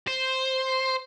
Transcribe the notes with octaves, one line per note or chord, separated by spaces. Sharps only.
C5